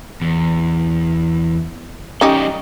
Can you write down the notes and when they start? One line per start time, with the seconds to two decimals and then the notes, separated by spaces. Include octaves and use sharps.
0.21 E2
2.21 G3 C#4 D#4 G4 D#5